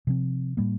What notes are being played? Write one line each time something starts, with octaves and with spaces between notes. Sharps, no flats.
C3 F3 C4
A2 G3 A#3